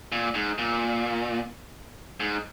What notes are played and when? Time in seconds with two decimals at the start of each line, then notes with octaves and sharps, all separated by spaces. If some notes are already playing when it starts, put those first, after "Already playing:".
0.12 A#2
0.35 G#2
0.58 A#2
2.20 G#2